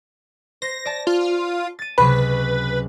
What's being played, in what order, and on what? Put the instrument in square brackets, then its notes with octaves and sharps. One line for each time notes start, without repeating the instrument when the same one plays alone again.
[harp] C5 [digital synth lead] A#6
[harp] D5 A5
[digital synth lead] F4
[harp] A6 D#7
[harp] C#2 C3 F#3 [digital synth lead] B4 [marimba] B5